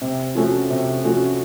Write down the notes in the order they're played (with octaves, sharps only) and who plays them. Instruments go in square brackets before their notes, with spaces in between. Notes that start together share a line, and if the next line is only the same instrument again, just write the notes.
[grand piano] C3
F3 A3 C#4 F#4
C3
F3 A3 C#4 F#4